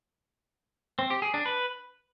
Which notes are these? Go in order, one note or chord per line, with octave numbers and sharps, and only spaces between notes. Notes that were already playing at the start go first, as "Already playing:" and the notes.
C4
G4
G#4
D4
B4